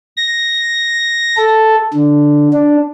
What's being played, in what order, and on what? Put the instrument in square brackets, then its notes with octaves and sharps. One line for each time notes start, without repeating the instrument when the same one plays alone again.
[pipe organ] A#6
A4
D3
D4